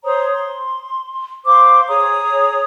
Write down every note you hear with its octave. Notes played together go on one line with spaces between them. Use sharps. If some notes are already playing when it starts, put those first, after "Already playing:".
C5 C#5 A#5 D#6
C6
C5 F5 C6 D6
G#4 C#5 A#5 D#6